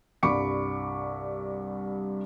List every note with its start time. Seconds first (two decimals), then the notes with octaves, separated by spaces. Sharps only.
0.23 C2 G2 B5 C#6 D6 C#7